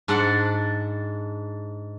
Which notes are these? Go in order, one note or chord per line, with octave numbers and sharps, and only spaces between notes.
G#2 D4 A4 F#5